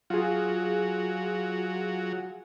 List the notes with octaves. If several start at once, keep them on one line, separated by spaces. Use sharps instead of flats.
F#3 F4 G#4